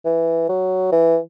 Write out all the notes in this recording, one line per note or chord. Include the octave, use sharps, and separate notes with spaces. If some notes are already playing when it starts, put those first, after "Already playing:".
E3
F#3
E3